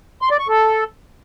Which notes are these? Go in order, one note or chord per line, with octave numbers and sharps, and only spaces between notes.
C6
D5
C#6
A4